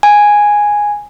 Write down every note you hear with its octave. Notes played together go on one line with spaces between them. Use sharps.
G#5